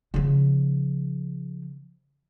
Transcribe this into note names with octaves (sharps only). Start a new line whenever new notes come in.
C#3 F3